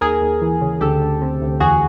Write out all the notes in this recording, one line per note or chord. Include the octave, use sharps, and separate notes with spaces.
D#2 G#4 A#4
D#2
E3
C#3
D2 G4 A4
D2
C3
D2
E2 F#4 G#4